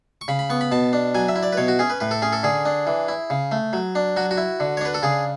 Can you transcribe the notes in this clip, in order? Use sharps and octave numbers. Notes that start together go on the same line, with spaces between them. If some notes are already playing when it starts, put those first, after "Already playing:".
C#6
C#3 B5
B5
B3 C#6
B5
B2 A5
D4
F#3 G#5
E5
E4
D5
B4
B2 C#5
F#4
C#4 G#4
B4
A2 B4
A4
C#4 G#4
A4
D3 G#4
D4
E3
E4
C#3
A3
F#3
D4
F#3 F#4
F#4
E4
D3
C#5
D4 B4
A4
C#3 G#4